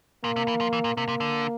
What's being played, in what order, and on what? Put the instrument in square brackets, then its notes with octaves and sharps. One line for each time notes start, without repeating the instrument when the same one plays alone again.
[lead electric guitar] A#2 [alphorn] A#3
[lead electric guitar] C3
E3
F3
E3
A#2
[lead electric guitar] C3 [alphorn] A#3
[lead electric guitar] C3
D3